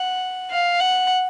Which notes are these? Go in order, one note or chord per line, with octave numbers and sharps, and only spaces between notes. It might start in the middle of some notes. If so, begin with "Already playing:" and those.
Already playing: F#5
F5
F#5